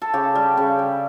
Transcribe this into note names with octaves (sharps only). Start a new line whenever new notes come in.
A4
C#3 G4
G3
C#3
G3